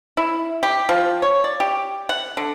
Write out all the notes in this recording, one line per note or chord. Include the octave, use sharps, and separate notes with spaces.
E4
G4
F3
C#5
D5
G4
F#5
D3